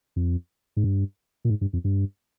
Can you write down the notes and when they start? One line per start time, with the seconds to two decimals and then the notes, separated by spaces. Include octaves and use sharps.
0.16 F2
0.77 G#2
0.84 G2
1.45 A#2
1.50 G#2
1.61 G2
1.73 F2
1.84 G2